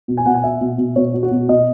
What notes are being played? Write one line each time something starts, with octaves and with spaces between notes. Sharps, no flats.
B2
G#5
B2 F#5
G#5
B2 E5
B2
B2
B2 C#5
B2
F#4
B2
B2 D#5